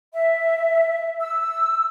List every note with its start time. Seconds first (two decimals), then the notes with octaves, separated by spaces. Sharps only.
0.12 E5
1.21 E6